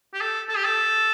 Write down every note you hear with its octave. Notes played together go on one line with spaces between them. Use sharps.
G4
A4
A4
G4
A4